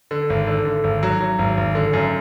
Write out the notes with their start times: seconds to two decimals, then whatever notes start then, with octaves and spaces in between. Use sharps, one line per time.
0.11 D3
0.30 G#1
0.47 D3
0.65 D3
0.84 G#1
1.03 F#3
1.20 F#3
1.39 G#1
1.57 G#1
1.75 D3
1.93 F#2